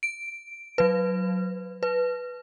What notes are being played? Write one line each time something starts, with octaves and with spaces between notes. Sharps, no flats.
D7
F#3 B4
B4